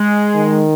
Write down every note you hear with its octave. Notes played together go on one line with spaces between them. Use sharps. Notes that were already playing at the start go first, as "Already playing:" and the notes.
Already playing: G#3
D#3